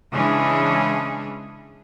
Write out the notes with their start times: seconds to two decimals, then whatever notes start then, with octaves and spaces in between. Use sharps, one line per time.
0.12 C#3 E3 G#3 C#4 D4 G#4